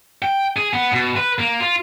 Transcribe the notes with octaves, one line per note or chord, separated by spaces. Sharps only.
G5
G#4
B3
B2
B4
A#3
F4